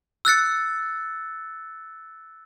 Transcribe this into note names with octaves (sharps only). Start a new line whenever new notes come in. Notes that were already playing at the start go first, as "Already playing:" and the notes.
E6 F#6 A6 C#7